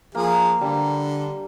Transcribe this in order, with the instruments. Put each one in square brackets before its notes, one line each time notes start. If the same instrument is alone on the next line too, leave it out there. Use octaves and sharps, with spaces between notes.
[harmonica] F3 G#4 [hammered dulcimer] A#3
[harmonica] D3 [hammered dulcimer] G3 A5